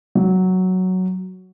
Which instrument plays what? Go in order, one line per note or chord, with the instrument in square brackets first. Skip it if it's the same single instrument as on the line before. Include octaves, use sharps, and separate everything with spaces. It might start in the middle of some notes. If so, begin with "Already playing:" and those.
[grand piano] F#3